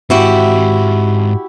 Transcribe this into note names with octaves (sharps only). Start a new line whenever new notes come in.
G#2 C4 E4 F#4 G4